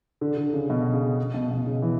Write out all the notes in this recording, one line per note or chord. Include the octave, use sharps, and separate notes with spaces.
D3
D3
C#3
B2
C#3
B2
B2
C#3
E3